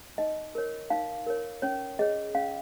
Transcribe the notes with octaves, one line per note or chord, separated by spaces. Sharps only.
D#4 D#5
A#4 C#5
D#4 F5
A#4 C#5
C#4 C#5
G#4 C#5 D#5
C#4 F5